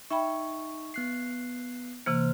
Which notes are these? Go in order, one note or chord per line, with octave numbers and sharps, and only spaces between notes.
D#4 E5 G5 B5 C#6
B3 F#6 C7
C3 E3 A#3 C5 F6